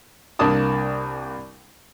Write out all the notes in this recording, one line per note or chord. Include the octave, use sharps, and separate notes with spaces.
C2 A#3 D4 D5 A5 D#6